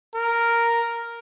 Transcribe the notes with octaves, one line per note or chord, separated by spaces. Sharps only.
A#4